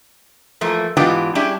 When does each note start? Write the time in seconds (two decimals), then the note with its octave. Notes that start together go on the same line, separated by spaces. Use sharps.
0.61 E3 F3 A3 A#3
0.97 G#2 E3 B3 D4 F4 G4
1.35 G3 C#4 D4 E4 G4 G#4